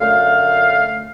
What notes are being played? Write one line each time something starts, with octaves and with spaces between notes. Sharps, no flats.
F#2 D3 A3 F5